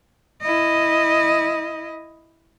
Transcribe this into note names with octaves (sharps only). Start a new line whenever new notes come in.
E4 D#5